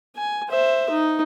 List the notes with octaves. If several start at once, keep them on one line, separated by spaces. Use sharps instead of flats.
G#5
C5 E5
D#4